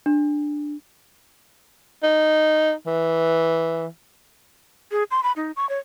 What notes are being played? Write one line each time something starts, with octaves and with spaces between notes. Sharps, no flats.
D4
D#4
E3
G#4
C6
B5
D#4
C#6
C#5